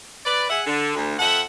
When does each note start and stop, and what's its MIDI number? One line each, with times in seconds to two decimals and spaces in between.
0.24 0.46 71
0.24 0.46 74
0.49 0.62 68
0.49 0.62 76
0.49 0.62 78
0.66 0.94 50
0.95 1.14 38
1.20 1.42 41
1.20 1.42 69
1.20 1.42 76
1.20 1.42 78